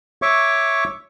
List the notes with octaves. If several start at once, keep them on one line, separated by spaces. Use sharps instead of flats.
C#5 E5 C#6 D6